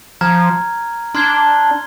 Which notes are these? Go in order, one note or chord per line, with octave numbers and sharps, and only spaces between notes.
F3 A#5 F6 G#6
D4 C6 F6 G#6 C7 G7